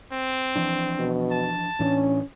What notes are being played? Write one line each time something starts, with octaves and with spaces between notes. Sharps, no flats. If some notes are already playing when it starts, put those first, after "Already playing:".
C4
E3 F3 D4
B2
A5
A2 E3 C#4 D4